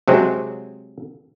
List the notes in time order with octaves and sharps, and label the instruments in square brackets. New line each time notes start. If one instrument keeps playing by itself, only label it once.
[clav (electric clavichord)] C3 F#3 G#3 C4